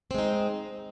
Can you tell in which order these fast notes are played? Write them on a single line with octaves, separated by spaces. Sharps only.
C4 G#3 D#4